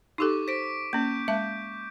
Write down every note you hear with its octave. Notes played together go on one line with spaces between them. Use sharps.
D#4 G4 A4 C#6 D6
C5 B6 D7
A#3 C#4 G6
G#3 E5 A5